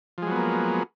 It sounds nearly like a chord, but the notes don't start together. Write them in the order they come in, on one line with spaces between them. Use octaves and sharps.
F3 G#3 F#3 B3 A#3